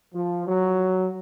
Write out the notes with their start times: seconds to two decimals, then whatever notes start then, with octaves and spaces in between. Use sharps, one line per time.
0.14 F3
0.47 F#3